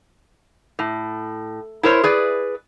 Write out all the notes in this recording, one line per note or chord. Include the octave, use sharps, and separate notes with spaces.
A2
E4 A#4 C5 C#5
G#4 B4 D5